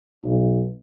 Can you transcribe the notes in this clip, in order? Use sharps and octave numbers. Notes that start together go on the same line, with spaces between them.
B1